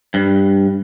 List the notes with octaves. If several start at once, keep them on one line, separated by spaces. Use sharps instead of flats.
G2